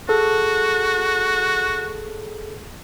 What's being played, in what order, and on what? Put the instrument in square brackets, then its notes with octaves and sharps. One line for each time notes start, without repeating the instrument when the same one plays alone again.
[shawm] F#4 [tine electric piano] G#4 A4